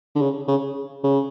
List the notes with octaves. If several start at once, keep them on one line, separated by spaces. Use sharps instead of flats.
D3
C#3
C#3
C#3